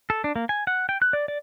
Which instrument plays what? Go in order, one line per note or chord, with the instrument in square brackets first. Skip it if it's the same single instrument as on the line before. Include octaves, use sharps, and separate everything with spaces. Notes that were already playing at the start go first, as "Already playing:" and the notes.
[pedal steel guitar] A4
D4
A#3
G#5
F#5
G5
F#6
D5
D5